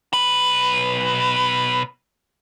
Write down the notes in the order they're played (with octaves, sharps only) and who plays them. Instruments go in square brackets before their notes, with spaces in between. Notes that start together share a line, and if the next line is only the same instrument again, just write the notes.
[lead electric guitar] B1 B4